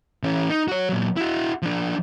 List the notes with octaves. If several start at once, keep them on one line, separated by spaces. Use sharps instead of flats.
E3 C#4
D#4
F#4 C#5
A#2 F#3
E4 F#4
F3 D4